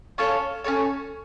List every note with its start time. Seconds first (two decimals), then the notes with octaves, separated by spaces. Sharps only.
0.18 C#4 F4 A4 C#5
0.64 C#4 F4 A4 C#5